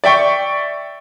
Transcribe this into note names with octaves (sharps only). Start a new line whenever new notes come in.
D5 E5 G5 C#6